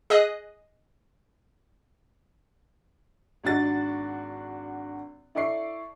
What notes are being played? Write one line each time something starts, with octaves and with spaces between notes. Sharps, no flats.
G#4 D#5 D#6 F#6
G#1 D4 F#4 A6
E4 A4 D5 C#6 C7